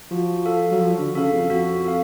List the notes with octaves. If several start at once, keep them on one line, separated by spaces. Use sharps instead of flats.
F3 F#4
A4 F5
F#3
F3 F#4
D3
C#3 A4 F5
F2
F2 F#4
A4 F5